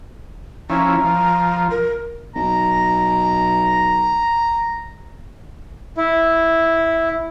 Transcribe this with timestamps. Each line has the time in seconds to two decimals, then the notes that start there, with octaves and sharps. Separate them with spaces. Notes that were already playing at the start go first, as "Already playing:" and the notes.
0.70 F3 C#4 E4 A#5
1.04 F3
1.71 A#4
2.35 B1 A#5
5.97 E4